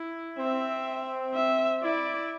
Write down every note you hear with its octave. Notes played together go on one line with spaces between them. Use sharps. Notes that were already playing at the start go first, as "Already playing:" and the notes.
Already playing: E4
C4 E5
E5
E4 D5